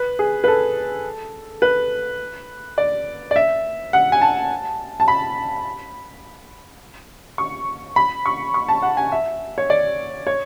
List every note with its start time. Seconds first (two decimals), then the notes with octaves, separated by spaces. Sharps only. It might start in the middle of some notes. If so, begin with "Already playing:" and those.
Already playing: B4
0.19 G#4
0.44 B4
0.48 A4
1.62 B4
2.78 D5
3.31 D5
3.36 E5
3.93 F#5
4.12 G#5
4.22 A5
5.00 A5
5.08 B5
7.38 C#6
7.96 B5
8.26 C#6
8.54 C#6
8.69 A5
8.82 F#5
8.97 G#5
9.12 E5
9.58 C#5
9.70 D5
10.27 C#5